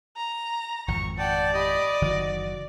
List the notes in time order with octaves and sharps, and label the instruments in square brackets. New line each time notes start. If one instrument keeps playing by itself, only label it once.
[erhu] A#5
[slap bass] G#1 F2 [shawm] C#6
[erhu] D5 [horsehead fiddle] F#5 G5 [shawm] A5
[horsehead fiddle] G4 B5 [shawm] D#5
[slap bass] F#1 D#3 E3 [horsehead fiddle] F#4